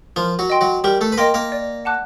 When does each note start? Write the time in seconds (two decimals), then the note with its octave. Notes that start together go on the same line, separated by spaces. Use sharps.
0.16 F3 F4 A#4
0.39 F#3 F#4
0.50 D#5 G5 C6
0.61 F#3 F#4
0.84 G3 G4 A#4
1.01 A3 A4
1.12 B4
1.17 A#3 A#4 D#5 G5 C6
1.34 A#3 A#4
1.52 D5
1.85 F#5 A5 D6 F#6